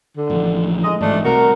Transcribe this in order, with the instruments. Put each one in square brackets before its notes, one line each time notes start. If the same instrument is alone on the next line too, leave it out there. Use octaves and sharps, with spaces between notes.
[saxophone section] D3
[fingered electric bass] A1 F3
[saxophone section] G#3 D#5
[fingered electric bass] A1 G#2 [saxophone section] A3 D4
[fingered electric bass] C2 C3 [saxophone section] F#4 A#4